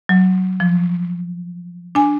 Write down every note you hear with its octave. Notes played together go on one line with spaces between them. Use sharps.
F#3
F3
D4 G#5